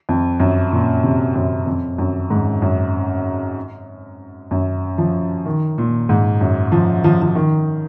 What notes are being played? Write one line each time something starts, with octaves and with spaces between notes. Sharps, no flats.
F2
F#2
A#2
C3
F#2
F2
F#2
G#2
F#2
F#2
F3
D#3
A#2
G#2
F#2
F3
F3
F3
D#3